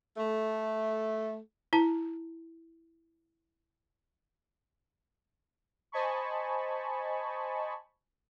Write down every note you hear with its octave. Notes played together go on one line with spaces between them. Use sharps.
A3
E4 A5
C5 D#5 G#5 A5 B5 C#6